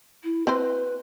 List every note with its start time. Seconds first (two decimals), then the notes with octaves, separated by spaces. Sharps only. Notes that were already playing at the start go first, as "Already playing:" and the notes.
0.24 E4
0.47 C4 E4 B4 C5